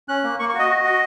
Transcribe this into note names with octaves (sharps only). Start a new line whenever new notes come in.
C#4 F#6
A#3
A#3 C#6
C#6
F#4
D#5
F#4
F#4